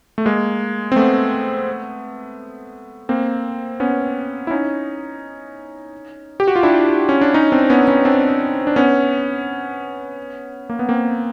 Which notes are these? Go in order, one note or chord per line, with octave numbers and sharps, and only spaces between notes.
A3
G#3 A#3
C4
A3 B3
A#3 C4
B3 C#4
E4
C#4 D#4
G4
F#4
F4
D4 E4
C#4
D4
C#4 D#4
C4 D4
B3 C#4
B3 C#4
C4 D4
D4
B3 C#4
A#3
B3
A#3 C4